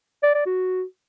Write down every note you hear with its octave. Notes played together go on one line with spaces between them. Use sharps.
D5
D5
F#4